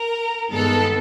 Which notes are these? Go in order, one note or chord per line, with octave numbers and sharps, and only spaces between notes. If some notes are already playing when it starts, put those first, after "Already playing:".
Already playing: A#4
G2 D#3 G#3 B3 A4